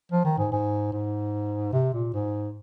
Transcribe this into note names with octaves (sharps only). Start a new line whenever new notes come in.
F3
D#3
G#2
G#2
G#2
C3
A#2
G#2